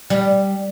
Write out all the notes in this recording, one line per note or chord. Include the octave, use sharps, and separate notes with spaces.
G3